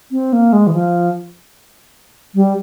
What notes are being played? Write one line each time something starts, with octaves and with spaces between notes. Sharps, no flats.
C4
A#3
G#3
E3
F3
G3